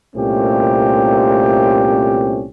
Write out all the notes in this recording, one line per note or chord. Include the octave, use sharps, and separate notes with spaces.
C2 A#2 A3 C4 C#4 G4